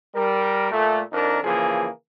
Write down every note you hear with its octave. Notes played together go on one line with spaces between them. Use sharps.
G3 A#4
A#2 A3
F2 D4 D#4 A#4
C#3 E3 F3 A#3 G#4